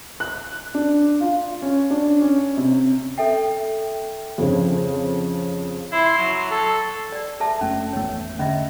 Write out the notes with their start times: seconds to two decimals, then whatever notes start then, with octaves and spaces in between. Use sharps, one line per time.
0.20 F#6
0.74 D4
1.20 F4
1.62 C#4
1.90 D4
2.21 C#4
2.57 C3
3.18 A4 E5 G5
4.38 F2 C#3
5.92 E4 C6
6.18 F#3
6.51 A4
7.12 D5
7.40 A4 E5 A5
7.61 F#1 A3 C#4
7.93 G#1 E2 A3 C#5
8.39 D3 C#4 D#5 E5